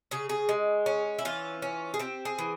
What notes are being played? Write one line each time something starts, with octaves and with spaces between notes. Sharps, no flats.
C#3 G#4
G#4
G#3
C#4
E4
E3 F4
C#4
G#4
C4 G4
G#4
E3